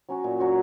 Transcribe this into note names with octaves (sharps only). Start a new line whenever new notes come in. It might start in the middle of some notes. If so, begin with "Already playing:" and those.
F#3 C#4 F#4
A#2
F#3 C#4 F#4